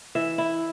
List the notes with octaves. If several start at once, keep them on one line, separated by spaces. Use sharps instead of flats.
E3 E5
E4